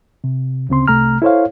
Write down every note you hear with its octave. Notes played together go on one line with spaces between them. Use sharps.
C3
D2 C#3 C4 C6
C2 C3 A3 A#5 F6
E4 A4 C5 C#5 F5